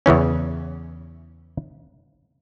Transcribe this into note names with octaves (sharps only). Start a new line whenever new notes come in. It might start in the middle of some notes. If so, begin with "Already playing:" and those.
E2 C#3 E3 C#4